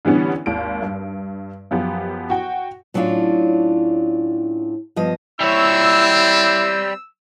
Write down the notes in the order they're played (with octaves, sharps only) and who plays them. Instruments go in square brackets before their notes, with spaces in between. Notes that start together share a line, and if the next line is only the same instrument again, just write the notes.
[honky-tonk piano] D3 E3 G3 B3 C#4
G#1 D#2 D7
G2
F#2 F3 B3 G4
F#4 G5
[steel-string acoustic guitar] A2 F#3 C#4 D4 F4
G2 F3 B3 D#5
[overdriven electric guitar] G3 C#5 [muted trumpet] C4 [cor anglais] E4 [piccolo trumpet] E6